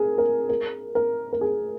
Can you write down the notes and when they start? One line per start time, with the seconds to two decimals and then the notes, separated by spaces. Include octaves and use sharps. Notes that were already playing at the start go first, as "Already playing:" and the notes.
Already playing: G#4 A#4
0.18 A#4
0.49 A#4
0.95 A#4
1.33 A#4
1.41 G#4